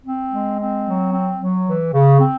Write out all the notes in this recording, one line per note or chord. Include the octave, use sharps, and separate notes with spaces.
C4
G#3
C4
F#3
C4
F#3
E3
C#3
C4